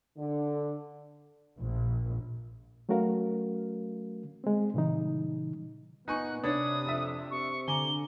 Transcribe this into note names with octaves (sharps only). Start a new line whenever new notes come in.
D3
A#1
F#3 A3 C#4 F#4 A#4 F5
G#3 C4
A#2 C#3 E3 G3 D#4
A#2 B3 D#4 G#5 C#6 F#6
C3 D4 B4 C#5 D#6
F2 D4 E5
C3 C#6
D3 G#5 A#5 D6 G7